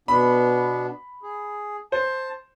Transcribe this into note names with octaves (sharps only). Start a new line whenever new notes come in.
B2 B3 D4 B5
G#4
C5 A5